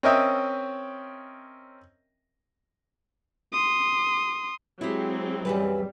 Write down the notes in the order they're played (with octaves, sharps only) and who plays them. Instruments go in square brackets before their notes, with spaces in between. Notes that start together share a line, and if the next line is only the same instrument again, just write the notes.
[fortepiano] C4 C#4 A#4 D#5 E5 G5
[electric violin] C6 D#6
[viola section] F#3 G#3 C4 [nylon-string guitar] E4 G4
[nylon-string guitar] F#2 E3 B4 [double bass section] G3